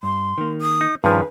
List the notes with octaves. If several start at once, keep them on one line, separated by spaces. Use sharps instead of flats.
G2 C6
D#3 A#3
D#6
D#4
G2 D#3 F3 C#4 G#4 B4